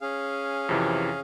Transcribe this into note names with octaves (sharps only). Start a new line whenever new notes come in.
C#4 G#4 F5
F2 C3 E3